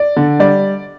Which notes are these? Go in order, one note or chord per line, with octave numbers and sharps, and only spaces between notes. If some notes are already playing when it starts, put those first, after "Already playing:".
Already playing: D5
D3
G3 D5